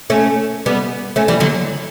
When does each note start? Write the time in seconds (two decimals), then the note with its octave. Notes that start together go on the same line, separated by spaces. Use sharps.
0.10 A3 C#4
0.66 G3 B3
1.16 A3 C#4
1.28 E3 G3
1.40 D3 F#3